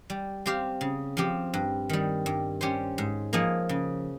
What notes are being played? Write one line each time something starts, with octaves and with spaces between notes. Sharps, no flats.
G3
C4 G4 C5 F5
C#3
F3 C4 G4
G2
D#3 G3
G2
G3 C#4 G4 C5
G#2
F3 A#3 D#4 G#4
C#3